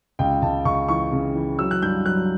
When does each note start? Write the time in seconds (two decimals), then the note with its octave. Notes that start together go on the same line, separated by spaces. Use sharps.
0.19 C#2 G5
0.42 C#2 A5
0.65 C#2 C#6
0.89 E3 C#6
1.12 C#3
1.35 E3
1.59 F#3 E6
1.71 F#6
1.82 G2 G6
2.06 F#3 F#6